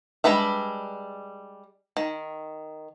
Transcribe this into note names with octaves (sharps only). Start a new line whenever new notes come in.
G3 G#3 D4 B4 E5
D#3